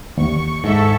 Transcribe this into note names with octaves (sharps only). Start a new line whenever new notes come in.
D#2 C#6
G#2 A4 E5 C#6